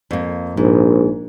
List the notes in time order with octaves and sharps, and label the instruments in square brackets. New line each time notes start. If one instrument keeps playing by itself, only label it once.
[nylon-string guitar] F2 A#3
[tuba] A#1 [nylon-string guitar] G#2